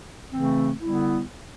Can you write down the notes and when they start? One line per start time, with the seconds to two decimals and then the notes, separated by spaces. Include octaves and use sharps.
0.32 C#3 E3 A3 C4
0.81 D3 G3 B3 E4